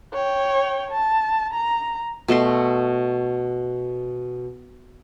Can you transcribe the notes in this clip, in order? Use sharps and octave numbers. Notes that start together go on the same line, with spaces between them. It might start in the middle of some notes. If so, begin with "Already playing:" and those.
C#5 G5
A5
A#5
B2 A3 F#4 C6